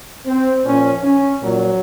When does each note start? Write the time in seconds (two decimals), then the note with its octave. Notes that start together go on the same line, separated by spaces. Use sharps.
0.26 C4
0.65 A#2 F3 C#4
1.03 C#4
1.42 A#2 F3 F#3